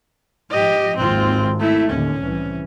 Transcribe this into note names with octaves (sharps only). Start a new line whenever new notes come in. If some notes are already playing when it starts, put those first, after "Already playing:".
G#2 F3 G4 D#5
G#1 D#2 C4 F4
A3 E4
D#2 A2 D3 C#4
C2 E3